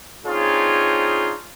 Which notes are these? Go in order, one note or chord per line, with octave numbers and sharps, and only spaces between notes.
C4 D4 D#4 F4 G#4 C#5